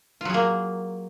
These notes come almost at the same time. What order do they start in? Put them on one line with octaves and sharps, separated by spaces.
F4 F#3 G#4 A#3